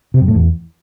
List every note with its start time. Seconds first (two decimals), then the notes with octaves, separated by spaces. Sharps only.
0.14 C3
0.21 F#2
0.28 A2
0.35 E2